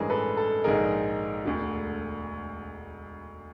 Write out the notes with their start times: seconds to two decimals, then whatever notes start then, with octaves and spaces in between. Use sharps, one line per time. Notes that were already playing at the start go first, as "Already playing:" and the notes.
Already playing: A1 G2 E3 G#3 G#4 A#4
0.10 A4 B4
0.37 A4
0.64 A#1 G#2 D#3 G#3 G#4 A#4
1.45 E1 D2 D3